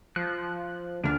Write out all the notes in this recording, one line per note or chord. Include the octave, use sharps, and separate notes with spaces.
F3 F#6
D2 D4 F6